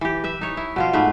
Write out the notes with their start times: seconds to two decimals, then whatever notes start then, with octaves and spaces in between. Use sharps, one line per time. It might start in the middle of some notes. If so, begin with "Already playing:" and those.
0.01 E3 G4
0.24 B4 E5
0.41 D#4 C#5
0.57 E4
0.76 B2 F3 F4
0.93 G#2 A3 B3 B4